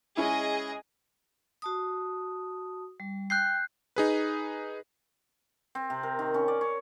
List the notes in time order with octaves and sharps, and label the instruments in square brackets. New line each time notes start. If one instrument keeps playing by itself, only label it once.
[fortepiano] G#3 C#4 E4 [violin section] G#4 D#5
[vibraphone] F#4 A5 D#6
G3
[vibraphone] G5 [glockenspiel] F#6 G6 C7
[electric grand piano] D#4 G#4 B4
[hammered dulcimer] C4
C3
A#4
D#3
C#4
D5
C#5